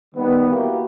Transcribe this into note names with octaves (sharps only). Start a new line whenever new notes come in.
D#3 G3 B3
A#3 E4 F#4 G4 A#4